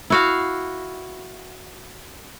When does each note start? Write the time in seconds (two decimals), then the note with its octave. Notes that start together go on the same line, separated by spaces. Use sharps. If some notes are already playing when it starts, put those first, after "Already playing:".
0.10 E4 F#4 F5